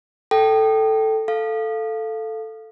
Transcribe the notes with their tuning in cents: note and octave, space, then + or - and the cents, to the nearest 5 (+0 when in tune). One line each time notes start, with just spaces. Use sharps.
A4 +0 G5 -10
A4 +0 F5 +0